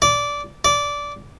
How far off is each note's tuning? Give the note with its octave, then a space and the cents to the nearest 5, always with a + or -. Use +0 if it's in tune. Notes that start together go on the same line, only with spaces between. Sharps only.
D5 -15
D5 -15